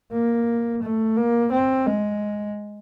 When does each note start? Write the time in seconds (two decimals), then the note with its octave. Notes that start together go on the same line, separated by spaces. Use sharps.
0.12 A#3
0.82 A3
1.16 A#3
1.52 C4
1.86 G#3